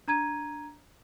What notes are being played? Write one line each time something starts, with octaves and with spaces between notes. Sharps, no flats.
D4 A#5 G#6 D#7